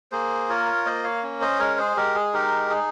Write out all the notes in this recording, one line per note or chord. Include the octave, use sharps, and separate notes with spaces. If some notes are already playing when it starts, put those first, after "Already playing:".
A#3 G#4 C5
F4 A#4 C#5
A#3 C5 D#5
C#5 F5
C#4
C5 D#5
G#3 A#4 C#5
G#4 C5
G#3 G4 A#4
G#4
D#4 G4 A#4
D#4 G#4